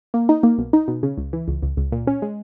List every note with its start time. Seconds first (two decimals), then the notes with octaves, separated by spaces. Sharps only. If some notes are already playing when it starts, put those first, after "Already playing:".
0.14 A#3
0.29 D#4
0.43 A#3
0.58 B1
0.73 D#4
0.88 B2
1.03 C#3
1.17 C#2
1.33 E3
1.48 C#2
1.63 C#2
1.77 C#2
1.92 A#2
2.07 C#4
2.22 G#3